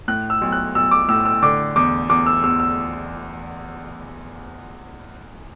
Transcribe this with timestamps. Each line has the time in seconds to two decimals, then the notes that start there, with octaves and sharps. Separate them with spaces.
0.08 A2 F#6
0.30 E6
0.41 B1
0.52 F#6
0.75 B1 E6
0.91 D6
1.09 A2 E6
1.25 E6
1.42 D3 D6
1.76 E2 D6
2.09 E2 D6
2.26 E6
2.43 E2 E6
2.60 E6